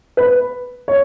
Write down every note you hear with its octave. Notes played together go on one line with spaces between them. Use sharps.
B4
C#5